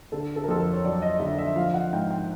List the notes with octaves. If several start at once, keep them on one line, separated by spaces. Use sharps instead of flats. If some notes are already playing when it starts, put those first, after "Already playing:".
D3 A4
A4
A#4
F2 A4
A#4
C#5
F#3 D5
D#5
D3 E5
E5
F3 F5
F#5
G#2 G5
G5